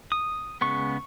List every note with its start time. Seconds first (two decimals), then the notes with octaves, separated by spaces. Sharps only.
0.12 D#6
0.61 C#3 G#3 B3 C#6